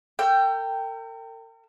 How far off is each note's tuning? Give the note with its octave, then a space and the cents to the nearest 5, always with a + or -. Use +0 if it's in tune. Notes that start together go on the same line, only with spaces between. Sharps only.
A#4 -45 G5 +0 E6 +30